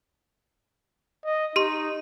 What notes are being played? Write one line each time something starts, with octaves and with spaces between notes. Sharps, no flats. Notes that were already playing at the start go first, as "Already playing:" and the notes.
D#5
D#4 G4 C6